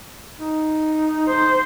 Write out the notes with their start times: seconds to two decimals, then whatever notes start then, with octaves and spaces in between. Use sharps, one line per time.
0.39 D#4
1.28 C5